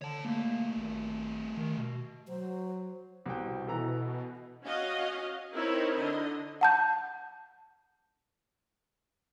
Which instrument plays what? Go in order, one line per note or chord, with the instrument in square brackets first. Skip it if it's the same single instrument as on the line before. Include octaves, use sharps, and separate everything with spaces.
[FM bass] D3 [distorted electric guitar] C#5 A5
[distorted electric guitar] G3 A3 [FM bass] A#3
[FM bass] G#1
D#3
B2
[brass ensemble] F#3 [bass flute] C5
[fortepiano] C2 G5 [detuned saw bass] B2
[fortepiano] E3 A4 A#5
[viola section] C#4 F#4 D#5 F5
C4 D#4 E4 A#4 C#5
D3 D#5
[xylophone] F#5 A5 G6